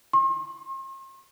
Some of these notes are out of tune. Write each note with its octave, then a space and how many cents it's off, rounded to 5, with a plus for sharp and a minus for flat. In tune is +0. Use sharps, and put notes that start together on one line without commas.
C6 +45